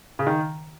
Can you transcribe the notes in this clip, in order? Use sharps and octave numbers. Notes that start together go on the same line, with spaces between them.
C#3
D#3